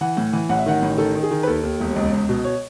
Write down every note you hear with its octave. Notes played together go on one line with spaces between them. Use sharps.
E3 F#5
A2
E3
A1 F#5
E5
D#3 F#5
A1
D#3 A4
D#3
G#4
D#3
B4
D#2 A4
D#2
E1
C#2
C#2
B2
C#5